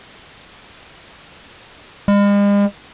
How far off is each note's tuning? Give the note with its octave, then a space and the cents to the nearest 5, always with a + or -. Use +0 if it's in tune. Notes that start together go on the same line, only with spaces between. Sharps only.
G#3 -45